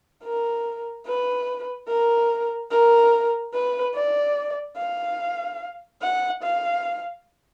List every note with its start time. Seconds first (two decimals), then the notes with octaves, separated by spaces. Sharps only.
0.24 A#4
1.06 B4
1.88 A#4
2.71 A#4
3.54 B4
3.95 D5
4.77 F5
6.02 F#5
6.43 F5